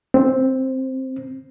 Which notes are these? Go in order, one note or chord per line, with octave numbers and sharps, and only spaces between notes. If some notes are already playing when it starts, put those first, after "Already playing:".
C4